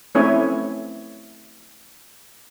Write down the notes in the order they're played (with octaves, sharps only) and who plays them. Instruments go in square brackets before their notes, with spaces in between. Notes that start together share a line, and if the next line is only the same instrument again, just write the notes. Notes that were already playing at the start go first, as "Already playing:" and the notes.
[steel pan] A3 C4 C#4 E4 C#5 G#5